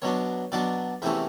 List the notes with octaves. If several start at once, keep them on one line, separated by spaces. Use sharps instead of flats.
B2 F#3 B3 D4 C#5
B2 F#3 B3 D4 D5
E2 C3 E3 A3 C#4 E5